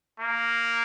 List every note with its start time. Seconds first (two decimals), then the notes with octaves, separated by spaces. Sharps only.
0.20 A#3